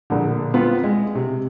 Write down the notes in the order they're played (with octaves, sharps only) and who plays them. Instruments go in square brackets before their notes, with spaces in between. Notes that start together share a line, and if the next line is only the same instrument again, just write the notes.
[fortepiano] A#1 D3
B3 C4 F4
G#3
C3